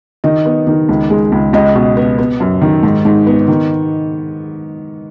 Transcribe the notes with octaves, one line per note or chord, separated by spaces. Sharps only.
D#3 D#5
B3
D#3
C#2
G#3
C#2
C#2 D#5
B2
B3
B3
F#2
D#3
G#2
G#2
B3
D#3